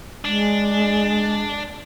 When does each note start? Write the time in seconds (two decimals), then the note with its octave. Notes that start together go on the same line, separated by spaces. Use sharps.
0.25 G#3 D4